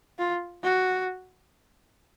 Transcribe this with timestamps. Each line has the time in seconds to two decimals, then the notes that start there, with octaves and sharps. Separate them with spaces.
0.19 F4
0.63 F#4